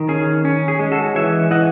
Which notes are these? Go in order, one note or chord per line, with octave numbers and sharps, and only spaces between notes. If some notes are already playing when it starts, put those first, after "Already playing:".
Already playing: D#3
C#4 G#4
C#4
G#4
G#3
F#4 A4
E3 C#5 E5
E3 D#5 F#5